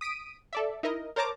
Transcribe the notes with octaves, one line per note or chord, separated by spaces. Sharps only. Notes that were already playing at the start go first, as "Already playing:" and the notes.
D#6 B6 D7 D#7
A4 D5 E5
D#4 E4 A#4 D#5
A#4 C5 C#5 A5 A#5 D6